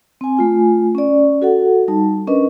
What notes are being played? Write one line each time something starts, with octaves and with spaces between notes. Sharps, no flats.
C4 G#5
A3 F4 G#5
C#4 D5
F#4 A4 F#5
G3 D#4 A5
C#4 D4 A#4 B4 D#5